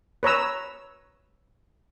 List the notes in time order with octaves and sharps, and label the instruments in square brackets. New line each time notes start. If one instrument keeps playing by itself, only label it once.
[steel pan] B4 C#5 A#5 E6